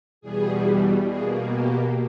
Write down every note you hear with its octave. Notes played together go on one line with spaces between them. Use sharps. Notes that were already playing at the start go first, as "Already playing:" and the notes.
E2 B2 G3 G#4
B2 A#3 G#4
G4